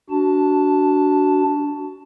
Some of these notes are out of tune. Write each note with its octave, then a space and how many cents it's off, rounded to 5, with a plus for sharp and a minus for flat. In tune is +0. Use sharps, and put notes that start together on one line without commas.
D4 -15 F#4 +15 A5 +0